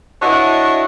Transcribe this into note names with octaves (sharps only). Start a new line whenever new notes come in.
D4 E4 F#4 C#5 D#5